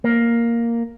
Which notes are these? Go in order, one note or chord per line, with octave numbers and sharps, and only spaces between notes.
A#3